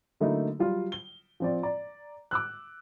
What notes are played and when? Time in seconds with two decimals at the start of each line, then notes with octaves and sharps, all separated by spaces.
0.20 D3 F#3 A3 A#3 D#4 E4
0.59 F#3 G3 F4
0.92 G7
1.40 F3 C4 D5
1.63 D5 A#5
2.31 D6 E6 F#6